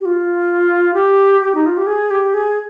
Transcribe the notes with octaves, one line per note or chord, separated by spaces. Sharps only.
G4
F4
G4
G4
D#4
F4
G4
G#4
G4
G#4